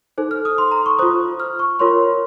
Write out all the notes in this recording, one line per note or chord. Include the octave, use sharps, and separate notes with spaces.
D#4 A4 C5
F6
D#6
C6
A#5
C#6
F4 C5 D#6
F6
C#6
F4 A#4 C#5 C6